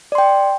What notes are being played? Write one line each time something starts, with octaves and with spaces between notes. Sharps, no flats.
D5 G5 C6